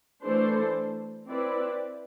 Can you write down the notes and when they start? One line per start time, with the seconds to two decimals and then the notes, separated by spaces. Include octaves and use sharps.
0.25 E3 A3 D4 A4 C5
1.27 C4 E4 B4 D5